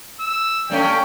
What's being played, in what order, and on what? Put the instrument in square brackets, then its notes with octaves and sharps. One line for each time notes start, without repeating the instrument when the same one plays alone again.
[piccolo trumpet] E6
[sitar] G2 A3 C#4 [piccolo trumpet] G5